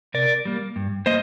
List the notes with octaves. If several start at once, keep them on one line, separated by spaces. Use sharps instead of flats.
C3 A#4 D5
G3 A#3
G2
A#3 C5 D#5